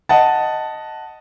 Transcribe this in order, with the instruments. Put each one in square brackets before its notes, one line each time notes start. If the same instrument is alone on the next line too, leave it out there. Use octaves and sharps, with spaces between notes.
[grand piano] D#5 F#5 A5